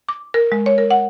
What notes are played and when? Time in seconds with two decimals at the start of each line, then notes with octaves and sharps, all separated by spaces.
0.09 D6
0.34 A#4
0.52 G#3
0.66 C#5
0.78 A#4
0.91 F#5